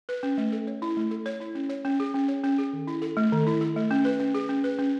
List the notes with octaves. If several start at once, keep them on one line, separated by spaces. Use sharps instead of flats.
B4
C#4
A3
A4
C#5
E4
A3
A4
C#5
E4
C#4
C#5
C#4
G#4
C#4
C#5
C#4
G#4
D#3
E4
A4
A3
D#3
E4
A4
A3
C#4
B4
C#4
G#4
C#4
B4
C#4